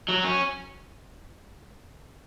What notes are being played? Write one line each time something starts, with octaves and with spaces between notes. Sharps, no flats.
F#3
C#4